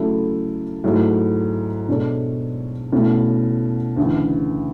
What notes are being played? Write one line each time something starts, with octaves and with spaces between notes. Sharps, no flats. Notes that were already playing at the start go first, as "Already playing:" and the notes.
Already playing: C#3 F#3 A3 E4 A4
G#2 F#3 A3 E4
B2 G#3 D4 A4 C#5
B2 A3 C#4 E4
D2 C#3 E3